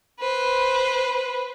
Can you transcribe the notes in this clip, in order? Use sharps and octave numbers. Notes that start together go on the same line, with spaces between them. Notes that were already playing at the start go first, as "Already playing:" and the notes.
B4 C5